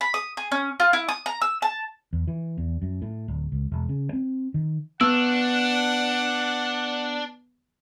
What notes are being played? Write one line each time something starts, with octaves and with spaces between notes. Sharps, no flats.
B5
D#6
G#4
C#4
F4
E4
D#6
A#5
E6
A5
E2
E3
E2
F#2
A2
D1
C#2
E1
C#3
C4
D#3
B3 D4 F#5 E6 F#6